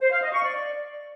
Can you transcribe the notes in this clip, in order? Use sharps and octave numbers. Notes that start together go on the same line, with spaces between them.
C5
F5
D#5
C#6
D5